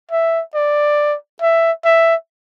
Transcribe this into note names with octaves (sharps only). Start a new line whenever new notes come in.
E5
D5
E5
E5